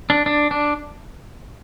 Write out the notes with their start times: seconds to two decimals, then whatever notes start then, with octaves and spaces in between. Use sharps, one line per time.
0.10 D4
0.26 D4
0.51 D4